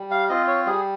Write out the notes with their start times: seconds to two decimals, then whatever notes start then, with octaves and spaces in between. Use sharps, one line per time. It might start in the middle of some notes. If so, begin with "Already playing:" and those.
Already playing: G3
0.11 F5
0.29 C4 F4 D#5
0.48 C#5
0.66 G3 G#4